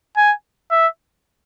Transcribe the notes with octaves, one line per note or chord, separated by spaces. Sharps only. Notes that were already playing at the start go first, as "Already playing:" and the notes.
G#5
E5